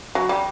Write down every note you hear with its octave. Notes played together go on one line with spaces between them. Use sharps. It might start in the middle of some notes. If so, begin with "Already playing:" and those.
F#3
G3